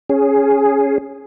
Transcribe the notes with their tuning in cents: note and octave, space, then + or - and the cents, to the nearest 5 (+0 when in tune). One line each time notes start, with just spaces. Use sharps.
C#4 +0 G#4 +0